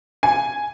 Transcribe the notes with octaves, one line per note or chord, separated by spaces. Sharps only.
G#5